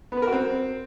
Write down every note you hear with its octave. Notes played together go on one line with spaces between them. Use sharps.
B3
B4
A#4
F#4
C4